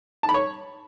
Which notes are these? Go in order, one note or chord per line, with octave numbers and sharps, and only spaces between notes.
A5
B5
C#5